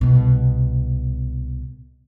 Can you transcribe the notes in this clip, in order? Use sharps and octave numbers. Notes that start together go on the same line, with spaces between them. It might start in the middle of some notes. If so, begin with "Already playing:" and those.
C2 B2